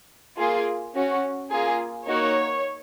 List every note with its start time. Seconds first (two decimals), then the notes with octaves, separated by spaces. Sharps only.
0.38 A#3 F4 G#4
0.95 C#4 F#4
1.51 A#3 F4 G#4
2.08 A#3 D#4 F#4 C#5